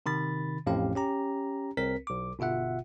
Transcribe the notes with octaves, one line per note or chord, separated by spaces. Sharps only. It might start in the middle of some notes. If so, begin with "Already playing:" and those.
C3 D#3 B5 A6
A1 F2 A2 C#4 G4 F5
C#4 G4 A#5
C2 C4 A#4 B6
B1 D6
G1 B2 F4 E5 F#5